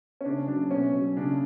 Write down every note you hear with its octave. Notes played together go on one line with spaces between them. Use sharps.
C#4
C#3 D4
F#3 D4
B2 C#4
F#3
C#3 D4